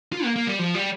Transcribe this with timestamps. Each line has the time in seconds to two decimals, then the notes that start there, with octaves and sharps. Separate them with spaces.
0.13 F4
0.24 A#3
0.36 A#3
0.47 G3
0.59 F3
0.75 G3